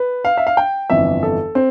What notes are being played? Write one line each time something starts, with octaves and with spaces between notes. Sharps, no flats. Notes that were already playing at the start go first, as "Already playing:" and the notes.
Already playing: B4
F5
E5
F5
G5
G1 F2 E3 E5
A4
C4